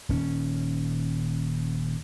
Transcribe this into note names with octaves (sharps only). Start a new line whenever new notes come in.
D#1 C#4